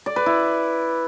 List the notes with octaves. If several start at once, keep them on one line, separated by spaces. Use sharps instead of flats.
D5
B4
E4